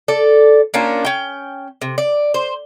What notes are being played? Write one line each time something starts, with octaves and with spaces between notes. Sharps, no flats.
A4 D5
A#3 C#4 D4 F4
C#4 G5
C3
D5
C5